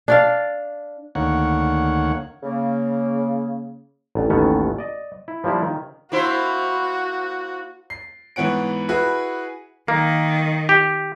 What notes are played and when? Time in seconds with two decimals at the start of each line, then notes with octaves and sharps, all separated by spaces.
0.08 D4 D5 F5
1.15 D2 D#3 A#3 C#5 F#5
2.43 C#3 A#3
4.15 A1 D2
4.30 A1 D#2 D#3 B3 C#4 A4
4.78 D5 D#5
5.28 E4
5.44 F3 G3 A#3 D4 E4
5.62 D#3
6.12 A#3 E4 F#4 C5
7.90 C7
8.36 G#2 E3 B3 C#5 F#5 D7
8.89 E4 F#4 G#4 B4
9.88 D#3 A#3
10.69 G4